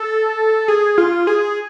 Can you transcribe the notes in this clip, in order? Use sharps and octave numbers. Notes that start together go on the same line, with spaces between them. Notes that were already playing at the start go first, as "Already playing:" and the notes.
Already playing: A4
G#4
F4
G#4